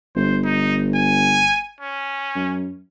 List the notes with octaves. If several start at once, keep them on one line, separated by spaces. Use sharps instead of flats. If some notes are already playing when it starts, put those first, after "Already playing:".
G1 C5
D#4
G#5
C#4
F#2